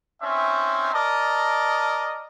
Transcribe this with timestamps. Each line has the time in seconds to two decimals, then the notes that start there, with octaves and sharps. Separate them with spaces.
0.22 C4 C#4 D#4 E5
0.93 A#4 D5 D#5 A5